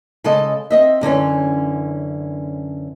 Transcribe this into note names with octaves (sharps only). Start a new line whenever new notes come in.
C#3 G#3 A4 D#5
C4 D#5 E5
F#2 D3 E3 C#4